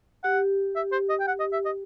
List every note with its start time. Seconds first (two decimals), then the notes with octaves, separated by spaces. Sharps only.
0.24 G4 F#5
0.76 E5
0.92 C5
1.10 D#5
1.20 G5
1.27 F#5
1.40 D#5
1.53 E5
1.65 D#5